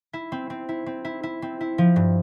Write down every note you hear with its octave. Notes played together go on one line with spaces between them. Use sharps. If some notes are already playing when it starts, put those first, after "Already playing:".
E4
C4
C4
E4
C4
E4
E4
C4
E4
F3
G2